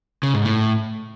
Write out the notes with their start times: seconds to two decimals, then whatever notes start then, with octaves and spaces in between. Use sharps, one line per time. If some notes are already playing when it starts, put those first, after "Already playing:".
0.23 C#3
0.34 G#2
0.45 A2